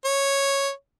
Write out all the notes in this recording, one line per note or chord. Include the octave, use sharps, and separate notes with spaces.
C#5